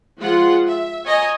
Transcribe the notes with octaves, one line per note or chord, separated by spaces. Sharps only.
F3 G#3 F4 G#4 F#5
E5
C#5 D#5 G#5 A#5